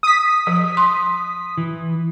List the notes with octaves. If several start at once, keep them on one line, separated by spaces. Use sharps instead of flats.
D#6 B6
F3
C6
E3